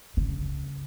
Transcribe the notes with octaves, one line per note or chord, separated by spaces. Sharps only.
C#3